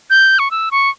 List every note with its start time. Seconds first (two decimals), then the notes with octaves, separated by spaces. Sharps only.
0.10 G6
0.39 C#6
0.51 E6
0.71 C#6